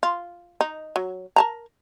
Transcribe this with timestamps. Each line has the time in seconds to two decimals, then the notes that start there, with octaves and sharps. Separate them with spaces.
0.03 F4
0.61 D#4
0.96 F#3
1.36 A#4 A5 A#5